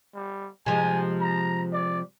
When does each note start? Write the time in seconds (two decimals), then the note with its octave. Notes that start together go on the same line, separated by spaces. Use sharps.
0.15 G3
0.66 C3 F3 G#3 G#5
1.21 A#5
1.73 D5